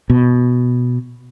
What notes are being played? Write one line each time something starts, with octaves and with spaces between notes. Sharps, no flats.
B2